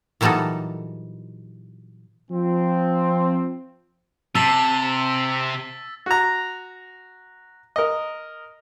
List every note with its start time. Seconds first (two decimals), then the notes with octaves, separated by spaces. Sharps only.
0.21 A#2 E3 F#3 G3 D#4 A4
2.31 F3 C4
4.35 C3 A5 E6 A6 B6
6.06 F#4 A#5
7.76 A#4 D#5